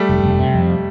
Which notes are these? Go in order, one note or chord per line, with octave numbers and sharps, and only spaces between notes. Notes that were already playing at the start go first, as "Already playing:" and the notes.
Already playing: G3 A3
F1
F1
C3
F2